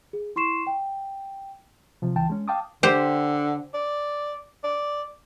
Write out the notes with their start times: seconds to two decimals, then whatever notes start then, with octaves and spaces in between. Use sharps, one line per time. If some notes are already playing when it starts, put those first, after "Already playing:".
0.13 G#4
0.36 E4 C6 C#6 C7 E7
0.67 G5
2.02 C3 F3
2.16 C#2 E3 G5 A5
2.29 G#3 C#4
2.48 F5 G5 A5 D6 D#6
2.83 D3 G4 C5
3.74 D5
4.64 D5